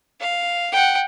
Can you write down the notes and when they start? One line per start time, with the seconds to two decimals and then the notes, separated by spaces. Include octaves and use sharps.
0.20 F5
0.72 F#5 G5